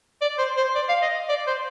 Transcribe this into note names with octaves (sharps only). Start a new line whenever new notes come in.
D5
C5
C5
D5
F5
D#5
D5
C5